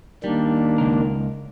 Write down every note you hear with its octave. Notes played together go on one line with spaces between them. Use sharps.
D#3 G3 A#3 D4
C#2 A#4